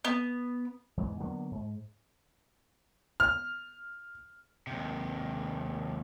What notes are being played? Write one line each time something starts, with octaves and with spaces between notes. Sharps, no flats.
B3
E2 G#2 E3
D3 F#3 A#3 B3
G#2
F6
D#2 C3